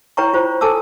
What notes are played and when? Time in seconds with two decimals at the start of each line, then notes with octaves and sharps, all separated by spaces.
0.17 E4 B4 C#5 G5 A#5 C#6
0.34 F4 C5
0.61 A4 G#5 A5 D6 E6